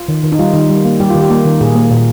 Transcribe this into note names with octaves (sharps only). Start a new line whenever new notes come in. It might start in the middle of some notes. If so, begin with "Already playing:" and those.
Already playing: F4
D#3
D#3
D#4
G3 F4
D#3
G3
A#3
G3 G4
D#3 F4
G4
A#3
D#3
A#2 G#4
A#3
A#2